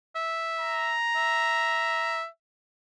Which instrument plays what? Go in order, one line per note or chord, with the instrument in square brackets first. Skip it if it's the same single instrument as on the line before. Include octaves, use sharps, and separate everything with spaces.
[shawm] E5
[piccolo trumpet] A#5
[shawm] E5